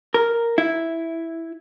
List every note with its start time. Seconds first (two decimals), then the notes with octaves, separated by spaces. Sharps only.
0.14 A#4
0.58 E4